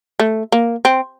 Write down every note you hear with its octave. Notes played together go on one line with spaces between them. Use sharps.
A3
A#3
C4